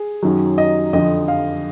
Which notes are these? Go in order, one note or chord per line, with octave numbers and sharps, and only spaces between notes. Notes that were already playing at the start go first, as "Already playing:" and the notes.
Already playing: G#4
F#2 D#3 F#3
D#5
F2 D3 F3 D#5
F5